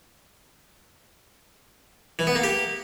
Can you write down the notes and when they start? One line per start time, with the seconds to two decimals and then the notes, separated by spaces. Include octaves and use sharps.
2.19 E3
2.27 B3
2.35 A#3
2.44 G4